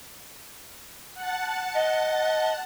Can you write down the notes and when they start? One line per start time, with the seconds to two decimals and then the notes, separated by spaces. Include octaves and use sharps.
1.14 F#5 A5
1.75 D#5